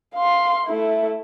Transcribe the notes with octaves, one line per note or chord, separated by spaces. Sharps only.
F5 C6
A3 E4